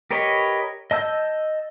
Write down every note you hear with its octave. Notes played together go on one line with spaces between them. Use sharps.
G4 A#4 B4 C#5 D#5
D#5 A5 E6 G6